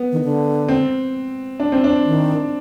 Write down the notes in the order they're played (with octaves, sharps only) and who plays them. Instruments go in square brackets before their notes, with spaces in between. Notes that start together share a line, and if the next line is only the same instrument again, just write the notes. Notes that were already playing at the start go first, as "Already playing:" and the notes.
Already playing: [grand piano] B3
[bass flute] D#3
D3
[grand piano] C4
D4
C4
D4
[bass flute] D#3